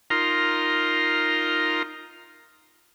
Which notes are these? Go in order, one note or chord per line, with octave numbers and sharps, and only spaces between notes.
D#4 F4 A#4 A#5 C6